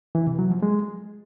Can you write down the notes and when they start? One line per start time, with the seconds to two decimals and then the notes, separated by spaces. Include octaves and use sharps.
0.15 E3
0.27 C3
0.39 F#3
0.51 F3
0.63 G#3